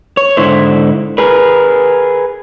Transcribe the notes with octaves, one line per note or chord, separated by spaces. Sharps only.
C#5
G#2 D3 E4 C5
G#4 A#4 B4